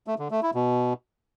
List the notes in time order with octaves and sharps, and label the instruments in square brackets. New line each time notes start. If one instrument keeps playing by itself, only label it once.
[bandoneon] A3
D3
A3
E4
B2